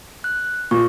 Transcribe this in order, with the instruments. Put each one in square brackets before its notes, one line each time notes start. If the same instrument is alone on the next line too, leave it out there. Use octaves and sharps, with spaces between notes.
[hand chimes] F#6
[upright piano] A#2 [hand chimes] C#6